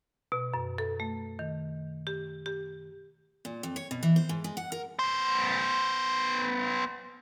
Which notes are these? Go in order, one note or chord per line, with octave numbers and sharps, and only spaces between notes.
B2
F#2
A4
A3
D#3
G4
G4
A#2
F2
C#5
B2
E3
C5
G#2
G#3
F#5
A#4
B3 C5